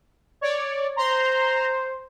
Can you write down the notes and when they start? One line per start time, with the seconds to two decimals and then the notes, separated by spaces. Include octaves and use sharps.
0.41 C#5 D5
0.96 C5 A#5 C6